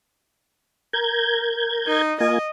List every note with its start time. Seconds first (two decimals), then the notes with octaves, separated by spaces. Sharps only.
0.93 A#4 G6 G#6
1.87 D#4
2.20 A#3 F4 D#5 G#5